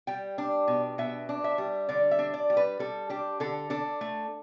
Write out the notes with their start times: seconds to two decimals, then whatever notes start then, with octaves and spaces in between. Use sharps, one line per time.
0.07 G3 G5
0.38 D4
0.68 B2
0.98 B2 E5
1.29 D4
1.44 E5
1.58 G3
1.89 D3 D5
2.11 E5
2.19 D4
2.34 D5
2.50 G3
2.57 B4
2.79 G3 A4
3.10 D4 G4
3.40 D3 A4
3.70 D4 A4
4.01 A3